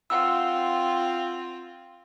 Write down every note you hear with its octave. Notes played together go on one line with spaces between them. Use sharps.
C4 F4 F5 F#5 E6